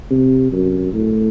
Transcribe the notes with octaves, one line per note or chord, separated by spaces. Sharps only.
C3
F#2
A2